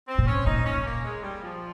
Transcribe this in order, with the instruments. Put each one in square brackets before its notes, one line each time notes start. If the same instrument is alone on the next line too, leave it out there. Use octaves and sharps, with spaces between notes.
[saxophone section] C4
[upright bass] A#2
[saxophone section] C#4
[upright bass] A#2 [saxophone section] D#4
[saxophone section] C#4
A#3
G#3
G3
F3